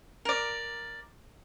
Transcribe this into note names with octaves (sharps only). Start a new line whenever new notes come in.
A#4 D5